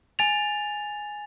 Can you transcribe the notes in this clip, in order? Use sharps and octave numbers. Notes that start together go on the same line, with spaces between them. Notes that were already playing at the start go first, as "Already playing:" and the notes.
G#5 A6 F7